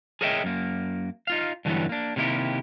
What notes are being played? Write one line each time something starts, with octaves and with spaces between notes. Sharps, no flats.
G#4 A#4 C#5 D#5 E5 G5
F#2 A#3
D#4 F4 F5
G2 D3 E3 F#3 G3 B3
A#3 D4
C3 D#3 A#3 E4 G4